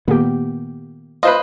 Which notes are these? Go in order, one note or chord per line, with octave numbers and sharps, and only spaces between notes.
A#2 D#3 A#3 B3 G4
F4 B4 C5 D#5